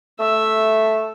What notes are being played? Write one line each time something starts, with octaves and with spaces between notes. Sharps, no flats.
A3 E5